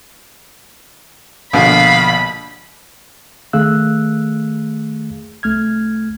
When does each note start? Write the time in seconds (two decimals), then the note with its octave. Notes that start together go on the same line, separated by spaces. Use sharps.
1.53 A#1 B2 D3 F5 B5
3.53 D#3 A3 G#4 F5 E6 F#6
5.43 C2 A3 F6 G#6